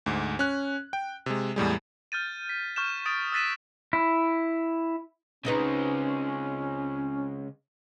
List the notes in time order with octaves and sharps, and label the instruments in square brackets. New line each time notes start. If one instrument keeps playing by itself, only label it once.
[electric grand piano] D2 G#2
C#4 F#6
G5
C3 G#3
E2 A2 G3 G#3
[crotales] F6 G6 A6 D#7
B6
C#6 F6 G6 E7
D#6 A6 D7
E6 F#6 A6 B6 D#7 E7
[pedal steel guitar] E4
[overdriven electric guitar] C#3 G#3 [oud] C4 D#4 B4 [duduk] C#4